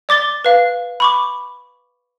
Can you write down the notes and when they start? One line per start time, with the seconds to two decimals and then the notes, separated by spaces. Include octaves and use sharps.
0.09 D5 D6 A6 G7
0.45 B4 F5
1.00 B5 C#6 D6